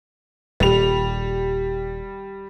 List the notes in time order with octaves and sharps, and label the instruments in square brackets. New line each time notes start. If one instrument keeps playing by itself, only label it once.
[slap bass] D#1 [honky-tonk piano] G3 F7